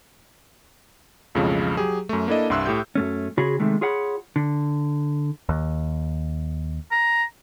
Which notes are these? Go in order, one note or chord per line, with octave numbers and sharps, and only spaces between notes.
B1 F2 A2 C#3 F3 G#3
F#3 G4 G#4
F#2 A3
A#3 D4 E4 A4 D#5
C2 G2 E5 C6 E6 F#6
A2 G4 G6
F#2 A3 C#4
C#3 F4 F#4 G#4 C#5 B5
C2 C3 D#3 G#3 A3
F4 G#4 C#5 F#5 B5
D3
D#2
A#5